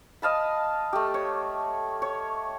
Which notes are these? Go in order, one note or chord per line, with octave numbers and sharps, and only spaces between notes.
D#5 F5 A5 B5
A3 G4
C#5
C#5